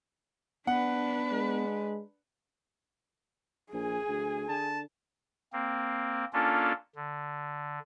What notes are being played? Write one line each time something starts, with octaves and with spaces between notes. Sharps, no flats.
B3 D4 B4 F#5
G#3
A#1 G#4 G#5
D2
D3 A5
A#3 C4
A#3 C#4 D4 F4 A4
D3